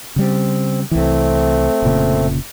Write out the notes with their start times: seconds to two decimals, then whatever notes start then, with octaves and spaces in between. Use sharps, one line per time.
0.16 C#3 G3 C4
0.91 C2 E3 A3 C4
1.82 F1 A#2 C#3